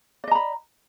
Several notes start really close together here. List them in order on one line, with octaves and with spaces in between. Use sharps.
D5 D#5 A#5 B5